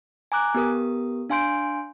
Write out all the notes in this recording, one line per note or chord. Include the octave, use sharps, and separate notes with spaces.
G#5 A#5 D6 F#6
B3 G4 A#4 D#6
D4 F5 G#5 C6 G6 D7